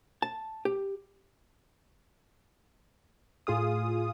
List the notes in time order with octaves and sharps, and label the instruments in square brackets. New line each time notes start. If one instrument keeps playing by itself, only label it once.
[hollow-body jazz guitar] A5
G4
[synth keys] A2 F4 G#4 F5 D#6